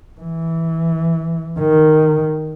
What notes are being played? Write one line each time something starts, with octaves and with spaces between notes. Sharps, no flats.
E3
D#3